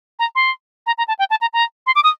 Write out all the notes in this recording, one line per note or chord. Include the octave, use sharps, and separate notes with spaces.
A#5
C6
A#5
A#5
A5
G5
A5
A#5
A#5
C6
D6
D#6